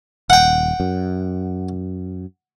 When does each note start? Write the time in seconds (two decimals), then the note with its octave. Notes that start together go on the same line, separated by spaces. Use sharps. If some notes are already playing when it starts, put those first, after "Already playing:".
0.30 D#1 F#5 G5
0.80 F#2